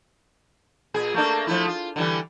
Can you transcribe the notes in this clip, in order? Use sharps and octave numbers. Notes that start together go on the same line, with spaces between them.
A#2 G#4
A3 A#3 D4
F3 A3 E4
F4
D3 E3 G3